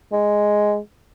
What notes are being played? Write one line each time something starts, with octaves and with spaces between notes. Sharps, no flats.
G#3